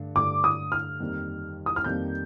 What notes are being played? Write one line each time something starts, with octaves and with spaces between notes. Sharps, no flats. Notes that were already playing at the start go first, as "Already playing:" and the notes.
Already playing: G2 D3 A3 D4
G2 D3 A3 D4 D6
D#6
F6
F2 D#3 G3 A#3
D#6
F6
F2 D#3 G3 A#3 G6